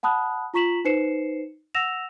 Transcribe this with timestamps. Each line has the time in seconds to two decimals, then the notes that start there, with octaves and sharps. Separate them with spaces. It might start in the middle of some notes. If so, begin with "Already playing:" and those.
0.03 F#5 A5 B5 D#6 F#6
0.54 F4 A#5 C#6 B6 E7 F#7
0.85 D#4 B4 C5 C7 C#7 E7
1.75 F#5 E6 A#6 E7 F7